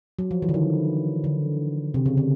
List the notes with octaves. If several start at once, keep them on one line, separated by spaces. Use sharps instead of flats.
F#3
F3
E3
D3
D#3
D3
C3
C#3
D3